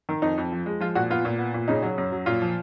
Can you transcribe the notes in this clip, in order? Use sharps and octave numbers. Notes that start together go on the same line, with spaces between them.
D#3
F2 D#4
F2
F3
G#3
F3 F4
A#2 F#4
B3 F4
A#2
B3
A#2
C#3 D#4
F#3
F#2
F#3
A#2 F4
F3